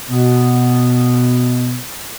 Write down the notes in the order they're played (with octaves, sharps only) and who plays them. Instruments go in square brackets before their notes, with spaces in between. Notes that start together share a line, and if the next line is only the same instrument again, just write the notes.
[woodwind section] B2 B3